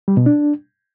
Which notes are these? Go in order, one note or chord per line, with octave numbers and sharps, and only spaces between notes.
G3
B2
D4